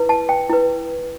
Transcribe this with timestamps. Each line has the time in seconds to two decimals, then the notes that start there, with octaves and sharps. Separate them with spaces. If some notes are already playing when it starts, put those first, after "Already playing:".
Already playing: E4 B4
0.09 A5
0.29 G5
0.49 E4 B4